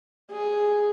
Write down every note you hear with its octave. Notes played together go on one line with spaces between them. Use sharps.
G#4